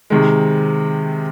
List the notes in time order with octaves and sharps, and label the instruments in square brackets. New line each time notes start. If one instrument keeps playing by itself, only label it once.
[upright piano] C3 D#3 G#3